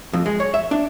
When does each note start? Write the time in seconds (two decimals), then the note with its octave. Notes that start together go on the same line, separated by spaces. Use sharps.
0.13 F2
0.26 G#3
0.40 C#5
0.54 E5
0.71 D4